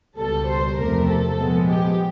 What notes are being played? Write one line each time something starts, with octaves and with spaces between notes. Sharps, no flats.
C#2 B2 G3 A4
C5
E2 C3 F3 A3 A#4
A4
A#2 F3 G#3 B3
G4